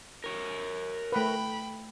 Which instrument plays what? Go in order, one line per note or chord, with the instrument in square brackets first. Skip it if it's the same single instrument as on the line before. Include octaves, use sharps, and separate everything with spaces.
[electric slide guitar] A#4 C#5
[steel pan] A3 B4 [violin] G5 B5